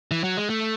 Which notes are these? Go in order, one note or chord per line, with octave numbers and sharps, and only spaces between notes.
E3
F#3
G#3
A3